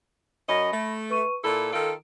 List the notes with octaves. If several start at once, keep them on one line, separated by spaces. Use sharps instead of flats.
F#2 C#4 D#5 B5 A#6
A3
B4 C#6 D#7
A#2 E4 A4 B5
D#3 F4 A4 D7